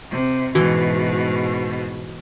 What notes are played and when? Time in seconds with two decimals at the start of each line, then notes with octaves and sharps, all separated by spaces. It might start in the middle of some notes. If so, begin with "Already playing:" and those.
0.11 C3
0.55 G#2 B2 E3 F#4